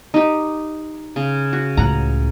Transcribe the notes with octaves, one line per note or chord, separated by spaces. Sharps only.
D#4 G4
C#3
F#4
C#2 A2 F#5 A#5